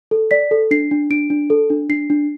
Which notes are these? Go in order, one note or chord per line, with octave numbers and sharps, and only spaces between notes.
A4
D5 B6
A4
D4 C7
D4
D4 D7
D4
A4
D4
D4 C7
D4